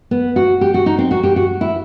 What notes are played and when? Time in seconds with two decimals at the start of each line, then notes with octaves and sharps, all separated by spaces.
0.11 B3
0.36 F#4
0.61 G4
0.74 F#4
0.86 D#4
0.98 C4
1.11 F#4
1.23 G4
1.36 F#4
1.61 E4